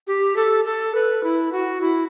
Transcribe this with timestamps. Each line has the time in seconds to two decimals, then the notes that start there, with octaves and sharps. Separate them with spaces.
0.07 G4
0.36 A4
0.65 A4
0.95 B4
1.24 E4
1.52 F#4
1.81 E4